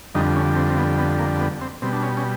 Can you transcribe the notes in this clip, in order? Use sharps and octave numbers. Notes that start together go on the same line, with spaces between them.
F2 D3 G3 D#4
C#4
C4
C4
B3
B3
A#3
B3
C4
B2 G3 C4
D4
C#4
C#4